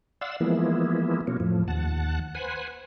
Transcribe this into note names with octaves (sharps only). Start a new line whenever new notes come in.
D5 F5 F#5 C6 E6
E3 F3 G#3 A#3 B3 E4
B2 F#3 A#3 C#4
F2 A2 F3
D#2 F#5 A5
B4 C5 F#5 G#5